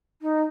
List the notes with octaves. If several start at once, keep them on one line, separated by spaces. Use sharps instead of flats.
D#4